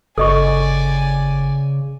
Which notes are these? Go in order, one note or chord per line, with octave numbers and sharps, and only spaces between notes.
G1 C#3 A4 D5 D#5 G#5 C#6